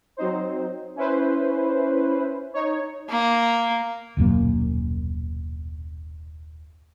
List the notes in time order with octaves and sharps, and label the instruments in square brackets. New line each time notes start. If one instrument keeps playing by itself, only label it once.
[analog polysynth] F#3 C4 D#4 C5
C#4 E4 B4 C5
D#4 C#5
[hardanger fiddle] A#3
[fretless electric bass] D#1 B1 F#2 A#3